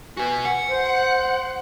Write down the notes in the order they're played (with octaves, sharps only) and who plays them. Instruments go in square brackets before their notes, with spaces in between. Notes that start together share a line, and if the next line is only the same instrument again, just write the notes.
[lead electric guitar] F#4 B4 [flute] G#5
[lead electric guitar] F#5
[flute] C5